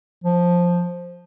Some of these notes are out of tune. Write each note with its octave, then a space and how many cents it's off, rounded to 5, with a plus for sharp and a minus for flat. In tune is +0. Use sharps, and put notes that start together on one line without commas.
F3 +5